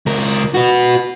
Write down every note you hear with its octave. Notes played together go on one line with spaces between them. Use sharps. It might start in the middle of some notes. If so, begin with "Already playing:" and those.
C#2 A#4
F#4 B4